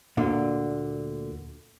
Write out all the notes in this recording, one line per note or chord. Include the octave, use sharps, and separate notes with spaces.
D2 A#2 D3